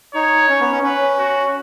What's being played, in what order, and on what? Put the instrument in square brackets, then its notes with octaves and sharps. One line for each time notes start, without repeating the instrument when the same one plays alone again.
[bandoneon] D#4 [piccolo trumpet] C#5
[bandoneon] C#4
B3
C#4
[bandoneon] C#4 [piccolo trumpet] B4
[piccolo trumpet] F#4